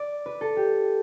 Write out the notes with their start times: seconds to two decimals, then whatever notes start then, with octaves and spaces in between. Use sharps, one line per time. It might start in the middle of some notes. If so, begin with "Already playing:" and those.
Already playing: D5
0.26 B4
0.41 A4
0.57 G4